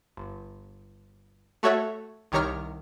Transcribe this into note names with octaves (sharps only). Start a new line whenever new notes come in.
G1
A3 F#4 A4 C#5 E5 F#5
C2 D#3 G4 C#5 A#5 F6